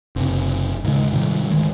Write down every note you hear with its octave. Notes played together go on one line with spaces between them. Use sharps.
F#1 C3
D#2 G#2 C#3 G#3
G#2 C3 D#3 G3
D2 D#3 G#3